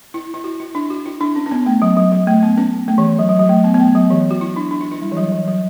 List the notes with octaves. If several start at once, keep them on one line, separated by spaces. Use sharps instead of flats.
E4
E4
F#4
E4
D4
F#4
E4
D4
C#4
C#4
B3
A3
F#3
F#3
F#3
A3
B3
C#4
A3
E3
F#3
F#3
F#3
A3
B3
B3
A3
F#3
E3
F#4
E4
D4
D4
E4
E4
G3
E3
F#3
E3
F#3